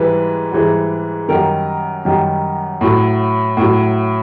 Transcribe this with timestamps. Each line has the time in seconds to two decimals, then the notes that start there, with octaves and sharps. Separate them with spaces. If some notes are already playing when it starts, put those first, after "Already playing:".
Already playing: G#2 E3 G3 B4
0.52 G#2 E3 G3
1.28 F#2 D#3 G3 A#4
2.05 F#2 D#3 G3
2.81 A2 F#3
3.57 A2
3.62 F#3